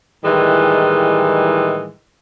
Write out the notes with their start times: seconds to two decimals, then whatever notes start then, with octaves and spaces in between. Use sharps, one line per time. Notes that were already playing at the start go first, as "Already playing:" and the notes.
0.24 A2 D#3 E3 G3 G#3